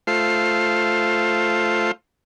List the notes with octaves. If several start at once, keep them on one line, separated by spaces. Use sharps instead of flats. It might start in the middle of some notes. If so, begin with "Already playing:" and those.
A3 F4 C5